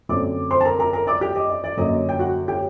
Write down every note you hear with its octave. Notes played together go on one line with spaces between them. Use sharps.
F#2 D3 A3 C4 D5 D6
C5 C6
A5
A#4 A#5
A#4 A#5
A#4 A#5
D5 D6
G4 G5
D#5
D5
D5
F#2 D3 F#3 A#3 D#5
G5
F#4 F#5
G4 G5